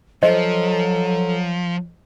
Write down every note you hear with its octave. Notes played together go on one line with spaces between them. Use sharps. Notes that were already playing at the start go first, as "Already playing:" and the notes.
F3 F#3 A4 C5 D#5